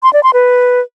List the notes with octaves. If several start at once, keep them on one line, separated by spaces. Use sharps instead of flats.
C6
D5
C6
B4